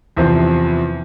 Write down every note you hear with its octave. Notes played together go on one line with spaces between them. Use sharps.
E2 C3 F3 C4